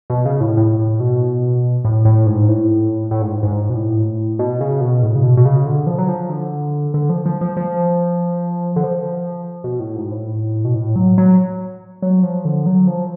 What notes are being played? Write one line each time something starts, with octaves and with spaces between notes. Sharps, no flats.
B2
C#3
A2
A2
A2
B2
A2
A2
G#2
A2
A2
G#2
G#2
B2
A2
B2
C#3
B2
A2
C#3
B2
B2
C#3
D3
F3
F#3
F3
D3
D3
F3
F3
F3
F3
D3
F3
B2
A2
G#2
A2
B2
A2
F#3
F#3
F#3
F3
D3
F#3
F3